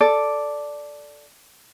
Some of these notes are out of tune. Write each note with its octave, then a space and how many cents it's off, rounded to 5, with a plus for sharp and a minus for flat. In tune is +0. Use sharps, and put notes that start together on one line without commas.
A4 +0 D5 +0